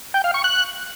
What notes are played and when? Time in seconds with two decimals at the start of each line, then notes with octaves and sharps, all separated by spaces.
0.14 G5
0.24 F5
0.34 C#6
0.44 F#6